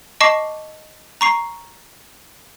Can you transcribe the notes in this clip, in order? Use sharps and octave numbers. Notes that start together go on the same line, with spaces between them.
D#5 A5 C#6 D6 C7
A#5 C#6 C7